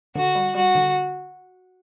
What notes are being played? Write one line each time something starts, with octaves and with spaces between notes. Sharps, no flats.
D3 F#4
G3
G3 F#4
D3